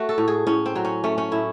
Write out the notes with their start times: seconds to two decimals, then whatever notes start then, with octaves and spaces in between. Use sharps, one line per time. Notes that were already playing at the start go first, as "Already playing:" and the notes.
Already playing: A3 F#4
0.09 A4
0.18 A2
0.28 G#4
0.47 A2 C#4
0.66 C4
0.75 F#3
0.85 C#4
1.04 A3 C#4
1.18 C#4
1.32 A2 E4